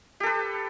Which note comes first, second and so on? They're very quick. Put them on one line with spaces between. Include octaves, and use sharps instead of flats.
G4 A4 B4